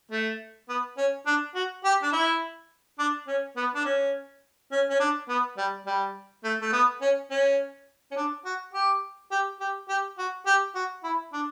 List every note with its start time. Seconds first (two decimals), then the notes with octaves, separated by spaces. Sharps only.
0.11 A3
0.69 B3
0.98 C#4
1.26 D4
1.55 F#4
1.84 G4
2.03 D4
2.13 E4
2.99 D4
3.28 C#4
3.57 B3
3.75 D4
3.85 C#4
4.72 C#4
4.90 C#4
5.00 D4
5.29 B3
5.58 G3
5.87 G3
6.44 A3
6.61 A3
6.73 B3
7.01 C#4
7.31 C#4
8.11 C#4
8.16 D4
8.45 F#4
8.73 G4
9.31 G4
9.60 G4
9.89 G4
10.18 F#4
10.46 G4
10.75 F#4
11.04 E4
11.33 D4